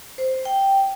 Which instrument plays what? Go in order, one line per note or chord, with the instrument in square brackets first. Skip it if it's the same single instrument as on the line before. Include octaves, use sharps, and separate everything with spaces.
[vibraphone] C5
G5